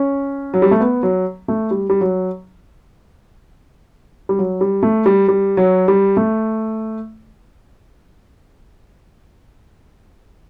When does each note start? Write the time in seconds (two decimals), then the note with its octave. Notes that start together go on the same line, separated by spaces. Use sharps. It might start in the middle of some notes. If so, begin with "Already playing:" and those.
Already playing: C#4
0.54 F#3
0.62 G3
0.71 A3
0.81 B3
1.03 F#3
1.48 A3
1.71 G3
1.90 G3
2.01 F#3
4.29 G3
4.39 F#3
4.61 G3
4.83 A3
5.06 G3
5.28 G3
5.57 F#3
5.88 G3
6.17 A3